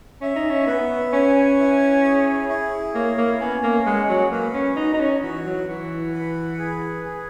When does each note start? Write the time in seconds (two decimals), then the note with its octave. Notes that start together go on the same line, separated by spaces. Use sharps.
0.21 C#4 E5
0.36 D#4
0.50 C#4
0.67 B3 B4
1.13 C#4 G#5
1.58 E4
2.04 G#4
2.49 E4
2.95 A#3 C#5
3.18 A#3
3.40 B3 C#4
3.63 A#3
3.86 G#3 F#5
4.09 F#3
4.31 A#3 B4
4.54 C#4
4.76 D#4 F#4
4.94 D#4
5.00 C#4
5.22 E3 F#4
5.46 F#3
5.68 E3 F#5
6.13 B4
6.58 G#4
7.04 G#4